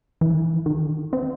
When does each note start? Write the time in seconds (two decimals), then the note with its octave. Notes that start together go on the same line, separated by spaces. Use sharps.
0.21 E3
0.66 D#3
1.13 C4